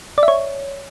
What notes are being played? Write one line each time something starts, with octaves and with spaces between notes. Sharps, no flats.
D5
E5
C#5